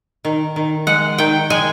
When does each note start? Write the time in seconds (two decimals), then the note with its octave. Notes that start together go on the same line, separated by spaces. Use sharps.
0.25 D#3
0.56 D#3
0.87 G#3 F#5
1.18 D#3 G5
1.50 G#3 G#5